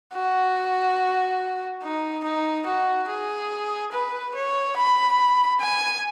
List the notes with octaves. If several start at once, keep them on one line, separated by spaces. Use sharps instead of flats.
F#4
D#4
D#4
F#4
G#4
B4
C#5
B5
G#5